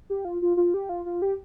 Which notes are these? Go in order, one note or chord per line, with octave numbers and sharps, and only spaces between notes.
G4
F4
F4
F4
G4
F4
F4
G4